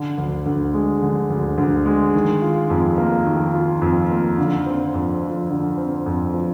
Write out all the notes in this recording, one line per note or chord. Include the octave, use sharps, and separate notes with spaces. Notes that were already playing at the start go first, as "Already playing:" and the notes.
Already playing: D3
D2
D2
G#3
D3
D2
D2
G#3
D#3
F4
F2
A#3
D#3
F4
F2
A#3
D3
C4
F2
F3
D3
C4
F2
F3